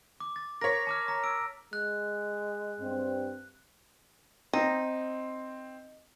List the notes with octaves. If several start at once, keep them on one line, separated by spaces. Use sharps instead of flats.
D6
A6
A#4 C#5 A#6 B6
A5 D6 F6
A#5
E6 D7
G#3 F#6
G2 C4
C4 D#4